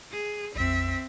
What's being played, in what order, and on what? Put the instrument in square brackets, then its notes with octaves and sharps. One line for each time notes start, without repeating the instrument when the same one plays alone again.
[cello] G#4
[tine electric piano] A#1 F2 [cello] C4 E5